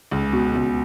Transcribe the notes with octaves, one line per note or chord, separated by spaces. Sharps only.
C#2
B2
C#2